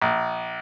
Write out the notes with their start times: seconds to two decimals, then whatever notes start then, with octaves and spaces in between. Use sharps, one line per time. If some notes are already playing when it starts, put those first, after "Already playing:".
0.02 A#1